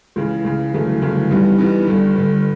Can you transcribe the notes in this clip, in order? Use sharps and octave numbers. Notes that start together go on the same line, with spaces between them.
C#2 C#3 E3
C#2 C#3 E3
G1 F#2 C#3 E3 A3
G1 F#2 C#3 E3 A3
G2 E3 G3 B3 D#4
G2 E3 G3 B3 D#4
G1 G2 D3
G1 G2 D3